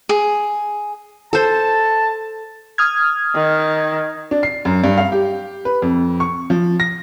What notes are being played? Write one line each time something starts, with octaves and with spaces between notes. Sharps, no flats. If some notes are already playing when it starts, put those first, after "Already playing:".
G#4
A4 C5 A5
D#6 F6 G#6
D#3
D4
C7
F#2
G2
F5
G4
B4
F2
C#6
F3
A#6